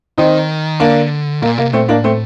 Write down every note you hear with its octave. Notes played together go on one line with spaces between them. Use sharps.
D#3 C4 D#4
D3 A#3 D4
A#2 A#3
C3 A#3
A#2 A3 C4
A2 A#3 D4
A3 C4